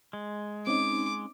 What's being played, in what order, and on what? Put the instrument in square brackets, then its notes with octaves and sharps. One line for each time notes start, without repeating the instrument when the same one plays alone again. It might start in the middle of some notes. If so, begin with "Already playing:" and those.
[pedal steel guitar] G#3
[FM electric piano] C4 C#4 D#4 [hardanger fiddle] D6